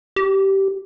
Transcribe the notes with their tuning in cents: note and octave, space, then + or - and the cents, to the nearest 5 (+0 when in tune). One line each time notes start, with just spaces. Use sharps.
G4 -15